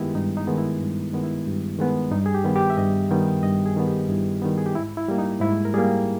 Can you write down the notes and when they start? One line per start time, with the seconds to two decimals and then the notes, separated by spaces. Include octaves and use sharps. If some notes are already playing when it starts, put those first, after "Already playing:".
Already playing: G2 D#3 G#3 B3 E4 G4
0.15 G2 D#4
0.37 D#4
0.47 D#3 G#3 B3
0.58 E4
0.81 G2
1.13 D#3 G#3 B3
1.24 E4
1.47 G2
1.79 D#3 G#3 B3
2.12 G2 D#4
2.26 G#4
2.34 G4
2.44 D#3 G3 B3
2.56 G4
2.70 E5
2.77 G2 D#5
3.11 D#3 G3 B3 G5
3.43 G2 D#5
3.66 G#4
3.77 D#3 G3 B3
3.88 G4
4.09 G2 E4
4.42 D#3 G3 B3 D#4
4.58 G#4
4.66 G4
4.75 G#2 E4
4.97 E4
5.09 G3 A#3
5.18 D#4
5.40 G#2 E4
5.65 A#4
5.74 G3 A#3 G#4